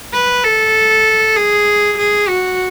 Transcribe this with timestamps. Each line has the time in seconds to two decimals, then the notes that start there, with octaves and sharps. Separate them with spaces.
0.13 B4
0.44 A4
1.36 G#4
1.98 G#4
2.28 F#4